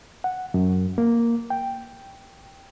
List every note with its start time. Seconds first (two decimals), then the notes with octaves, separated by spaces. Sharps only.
0.24 F#5
0.54 F#2
0.98 A#3
1.50 G5